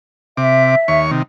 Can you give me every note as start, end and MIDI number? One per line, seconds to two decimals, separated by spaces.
0.37 0.75 48
0.37 1.00 76
0.37 0.75 86
0.88 1.11 39
0.88 1.11 73
0.88 1.11 85
1.11 1.22 48
1.11 1.22 51